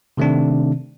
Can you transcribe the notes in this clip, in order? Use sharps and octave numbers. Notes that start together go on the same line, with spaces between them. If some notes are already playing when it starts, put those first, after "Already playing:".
C3 D#3 A3 C4 D4